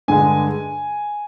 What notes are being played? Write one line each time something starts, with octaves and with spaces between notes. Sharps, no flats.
G2 D3 G#3 G#5